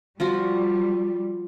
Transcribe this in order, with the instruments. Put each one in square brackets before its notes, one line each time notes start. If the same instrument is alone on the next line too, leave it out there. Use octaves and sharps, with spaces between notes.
[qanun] F3 F4 F#4 [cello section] G3